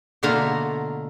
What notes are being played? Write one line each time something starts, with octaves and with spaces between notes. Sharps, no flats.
B2 D3 A3 A#3 F4 A#5